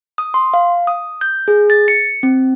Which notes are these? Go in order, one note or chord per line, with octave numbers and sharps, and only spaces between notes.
D#6
C6
F5
D#6
G6
G#4
A6
C#7
C4